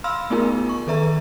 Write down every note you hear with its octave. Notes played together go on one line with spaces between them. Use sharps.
F5 B5 C6 E6 F6
A3 B3 D#4 F4 G#4 A#4
C#6
D#3 A4 B4 E5 A#5